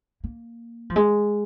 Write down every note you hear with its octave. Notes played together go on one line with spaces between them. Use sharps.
A#3
F3
G#3